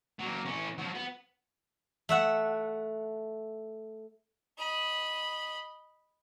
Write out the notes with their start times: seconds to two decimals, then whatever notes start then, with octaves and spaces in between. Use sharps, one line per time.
0.19 F#3 A#3
0.45 E3 C#4
0.78 F3 F#3
0.95 B3
2.09 A3 E5 F#5
4.59 D#5 B5